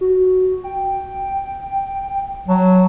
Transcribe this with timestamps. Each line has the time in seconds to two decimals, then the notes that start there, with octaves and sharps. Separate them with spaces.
0.01 F#4
0.64 G5
2.48 F#3 A5